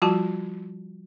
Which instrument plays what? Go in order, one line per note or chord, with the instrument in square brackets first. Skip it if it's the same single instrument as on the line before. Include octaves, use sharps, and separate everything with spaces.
[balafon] F3 G3 F4 F#4 A5